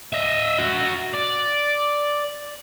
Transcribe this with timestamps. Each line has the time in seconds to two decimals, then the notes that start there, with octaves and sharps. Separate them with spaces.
0.13 D#5 E5
0.59 F#4 E5
1.14 D5